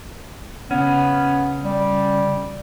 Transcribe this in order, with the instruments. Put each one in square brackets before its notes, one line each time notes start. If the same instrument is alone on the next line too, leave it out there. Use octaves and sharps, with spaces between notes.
[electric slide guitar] C#3 C#4 [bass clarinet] B3
[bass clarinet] G3